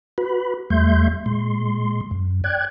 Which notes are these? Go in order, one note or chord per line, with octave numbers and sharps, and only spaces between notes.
F#4 B4 B5
E2 G3 A3 E5 C6 G6
A#2 G#3 C6
F#2
D5 G5 F#6 G#6